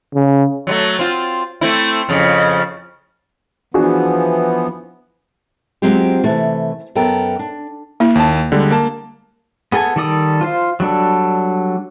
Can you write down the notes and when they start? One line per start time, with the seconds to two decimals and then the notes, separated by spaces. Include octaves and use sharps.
0.14 C#3
0.67 F#3 G3 A3
0.99 C4 F4
1.61 A3 C4 E4
2.09 F2 C#3
3.74 E3 F3 B3 D4 F#4 G#4
5.82 F#3 G#3 C4 F4 G4
6.24 C3 E3 A3
6.95 F#2 B3 A4 A#4 G5 A#5
7.39 D4
8.00 A#3 E4
8.15 D#2 A5
8.52 D3 G3 G#3
8.71 A#3 A5
9.72 B3 G#4 A4 G#5
9.96 D#3 G3 A4 D5 D#6
10.41 F4 C5 F5
10.80 F#3 G3 D4 A4